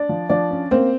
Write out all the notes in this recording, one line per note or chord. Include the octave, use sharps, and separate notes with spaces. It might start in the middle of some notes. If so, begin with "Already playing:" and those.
Already playing: D4 D5
F3
F3 D4 D5
C#4
A#3 C4 C5